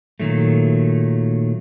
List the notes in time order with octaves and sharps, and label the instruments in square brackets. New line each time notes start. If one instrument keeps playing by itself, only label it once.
[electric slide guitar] A#2 D#3 F#3 A3